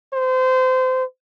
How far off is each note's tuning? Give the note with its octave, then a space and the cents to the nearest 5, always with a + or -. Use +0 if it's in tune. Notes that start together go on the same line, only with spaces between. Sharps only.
C5 -25